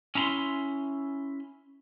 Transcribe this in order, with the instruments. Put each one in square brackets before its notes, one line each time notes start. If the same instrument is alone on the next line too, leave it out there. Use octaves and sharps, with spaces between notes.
[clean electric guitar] C#4 E4 A#5 C6